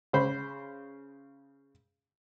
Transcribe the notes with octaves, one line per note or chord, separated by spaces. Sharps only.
C#3 C5 B5